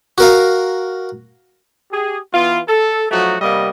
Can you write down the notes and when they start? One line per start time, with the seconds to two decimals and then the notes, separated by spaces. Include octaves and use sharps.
0.18 F#4 A#4 F5
1.91 G4 G#4
2.32 E3 B3 F4
2.69 A4
3.10 F3 F#3 A3 D#4 F#4
3.41 C3 G3 A#3 B3 D#5